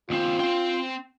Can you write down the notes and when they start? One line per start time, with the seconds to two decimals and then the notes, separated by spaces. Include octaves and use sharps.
0.10 D#2 C4 F4
0.40 C4 G5